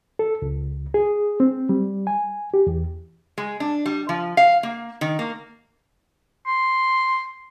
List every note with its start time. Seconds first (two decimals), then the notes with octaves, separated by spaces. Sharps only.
0.19 A4
0.42 C#2
0.94 G#4
1.40 C4
1.69 G3
2.07 G#5
2.54 G4
2.67 E2
3.38 G#3
3.60 D4
3.86 G3
4.09 F3
4.37 F5
4.63 A#3
5.01 D#3
5.19 A#3
6.47 C6